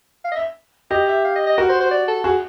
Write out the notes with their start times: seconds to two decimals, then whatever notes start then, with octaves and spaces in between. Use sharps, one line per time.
0.25 F5
0.31 D#5
0.35 E5
0.91 G4 D#5
1.08 E5
1.25 F5
1.36 D#5
1.47 D#5
1.58 F#4 A#4
1.69 C5
1.80 C5
1.91 D5
2.08 A4
2.24 F#4 G#4